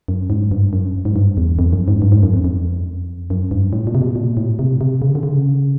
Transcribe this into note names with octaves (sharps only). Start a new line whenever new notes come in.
F#2
G#2
G2
F#2
G#2
G2
E2
F2
F#2
G#2
G2
G#2
F#2
F2
F2
F#2
G2
A2
A#2
C3
B2
A#2
A2
C3
C3
C#3
D3
C#3